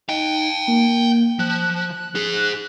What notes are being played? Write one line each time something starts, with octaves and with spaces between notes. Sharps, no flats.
D#4 F5 G5
A#3
F3 F#6
D#4 G#4